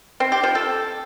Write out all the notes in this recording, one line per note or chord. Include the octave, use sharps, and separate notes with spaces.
C4
G4
F3
A4